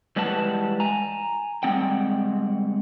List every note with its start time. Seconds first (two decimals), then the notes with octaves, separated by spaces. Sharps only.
0.16 E3 G3 G#3 B4 F#5 A5
0.80 G#5 A#5
1.63 G3 G#3 C4 F#5 G5